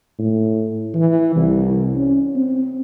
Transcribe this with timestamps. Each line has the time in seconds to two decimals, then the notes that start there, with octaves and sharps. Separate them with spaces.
0.19 A2
0.94 E3
1.36 C2
1.95 C#4
2.35 C4